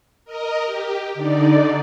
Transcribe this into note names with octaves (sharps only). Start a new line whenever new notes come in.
A#4 D#5
G4
D3 D#4 D5